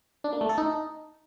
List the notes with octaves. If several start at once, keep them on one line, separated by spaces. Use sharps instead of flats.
D4
A#3
A3
A4
D#4